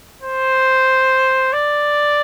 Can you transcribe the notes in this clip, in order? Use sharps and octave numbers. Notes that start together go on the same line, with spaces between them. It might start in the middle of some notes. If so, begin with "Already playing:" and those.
C5
D5